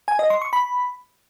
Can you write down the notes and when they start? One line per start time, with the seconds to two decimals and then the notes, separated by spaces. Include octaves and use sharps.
0.08 G#5
0.19 D#5
0.30 C6
0.41 C#6
0.53 B5